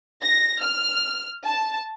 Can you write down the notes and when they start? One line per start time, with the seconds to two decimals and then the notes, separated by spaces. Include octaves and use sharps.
0.24 A#6
0.63 F6
1.44 A5